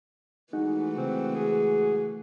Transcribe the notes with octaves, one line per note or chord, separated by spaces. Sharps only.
E3 G#3 A3 D#4 F#4
C#3 C4
G#4